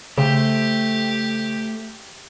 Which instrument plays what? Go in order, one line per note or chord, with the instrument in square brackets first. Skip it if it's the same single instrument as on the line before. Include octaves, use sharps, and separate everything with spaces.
[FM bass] C#3 [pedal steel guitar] A3 C5 [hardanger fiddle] G4